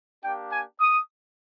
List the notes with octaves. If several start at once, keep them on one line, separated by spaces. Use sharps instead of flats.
A#3 D4 G4 G5
G#5
D#6